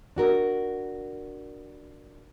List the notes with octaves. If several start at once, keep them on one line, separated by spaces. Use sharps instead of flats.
D4 F#4 A#4